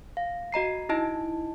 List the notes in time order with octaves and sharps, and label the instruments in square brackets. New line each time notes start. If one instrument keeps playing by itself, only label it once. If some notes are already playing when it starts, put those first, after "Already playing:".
[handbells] F5
F#4 D#5 A#5 C7
D#4 E4 D#5 A5